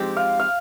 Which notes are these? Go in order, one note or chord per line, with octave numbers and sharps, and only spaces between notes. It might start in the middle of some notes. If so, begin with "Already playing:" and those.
Already playing: F3 G#3 C4 D#4 G4
F5
F5